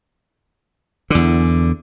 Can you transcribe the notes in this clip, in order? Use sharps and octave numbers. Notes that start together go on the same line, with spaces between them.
E2 D3